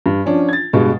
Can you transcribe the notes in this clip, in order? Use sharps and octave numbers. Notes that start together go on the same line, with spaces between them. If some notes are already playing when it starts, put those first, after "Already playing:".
G2
F3 C#4 D4
G#6 A6
G2 B2 G#3